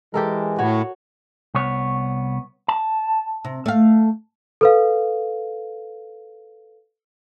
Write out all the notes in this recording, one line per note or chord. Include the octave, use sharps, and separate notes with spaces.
E3 G#3 G4 A4 A#4
A2 F#4 C#5
C2 B3 C#5
A5
C3
A3 F5
A4 B4 F5